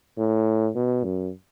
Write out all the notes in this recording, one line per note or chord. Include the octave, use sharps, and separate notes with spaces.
A2
B2
F#2